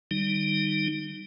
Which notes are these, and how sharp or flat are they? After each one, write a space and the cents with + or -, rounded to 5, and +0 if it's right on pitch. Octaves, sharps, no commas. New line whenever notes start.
D3 +45 G3 +0 D#4 +0